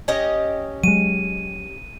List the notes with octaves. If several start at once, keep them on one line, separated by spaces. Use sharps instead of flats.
C#4 G4 D#5
F#3 G#3 D#7